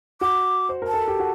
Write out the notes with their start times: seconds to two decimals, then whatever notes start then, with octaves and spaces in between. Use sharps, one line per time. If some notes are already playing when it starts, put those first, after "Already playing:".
0.21 F#4 D6
0.69 C5
0.82 A#4
0.88 A5
0.94 A4
1.08 G4
1.19 F#4